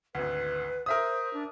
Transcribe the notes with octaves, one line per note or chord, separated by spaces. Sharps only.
G#1 D2 B4
A#4 C5 E5 D#6
D4